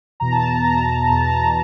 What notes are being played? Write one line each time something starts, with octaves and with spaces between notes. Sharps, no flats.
E2 B2 A#5
A5
A#5
A#5
A#5
E2 B2 A5
A5
A#5